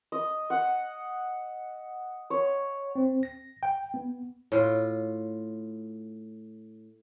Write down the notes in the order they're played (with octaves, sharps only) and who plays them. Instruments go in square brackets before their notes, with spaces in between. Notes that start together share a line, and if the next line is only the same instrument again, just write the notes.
[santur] D#5
F#5
C#5
[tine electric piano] C4
A#6
G5
B3
[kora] A2 F4